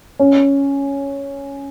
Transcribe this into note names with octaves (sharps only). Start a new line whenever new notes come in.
C#4